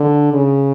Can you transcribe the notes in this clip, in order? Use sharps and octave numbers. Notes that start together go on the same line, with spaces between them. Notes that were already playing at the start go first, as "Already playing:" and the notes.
Already playing: D3
C#3